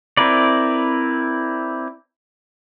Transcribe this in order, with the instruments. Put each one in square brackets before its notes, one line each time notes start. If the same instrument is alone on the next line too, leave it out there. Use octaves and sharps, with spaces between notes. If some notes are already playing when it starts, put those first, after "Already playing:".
[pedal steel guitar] C4 E4 A#4 B4 D5